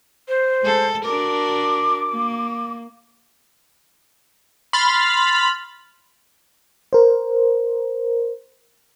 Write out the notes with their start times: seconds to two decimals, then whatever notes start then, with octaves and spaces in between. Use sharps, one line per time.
0.28 C5
0.63 G#3 A4
1.05 D4 F#4 A#4 D6
2.10 A#3
4.73 B5 C6 F6 A6
6.93 A#4 C5